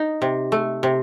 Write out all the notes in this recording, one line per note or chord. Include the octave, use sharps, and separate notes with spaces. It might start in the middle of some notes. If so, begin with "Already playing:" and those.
Already playing: D#4
C3
A3
C3